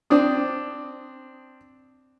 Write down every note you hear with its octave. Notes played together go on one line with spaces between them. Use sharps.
C4 D4 D#6